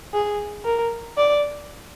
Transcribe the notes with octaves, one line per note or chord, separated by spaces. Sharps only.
G#4
A#4
D5